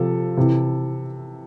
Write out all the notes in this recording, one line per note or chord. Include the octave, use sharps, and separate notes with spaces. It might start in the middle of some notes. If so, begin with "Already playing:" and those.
Already playing: C3 F3 A4
C3 E3